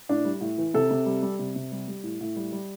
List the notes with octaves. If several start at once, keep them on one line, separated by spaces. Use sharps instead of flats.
A2 D4
G3
A2
E3
C3 A4
C3
G3
G3
C3
C3
G3
G3
A2
A2
G3
G3